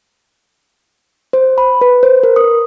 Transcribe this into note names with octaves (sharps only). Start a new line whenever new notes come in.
C5
B5
B4
C5
A#4
D#6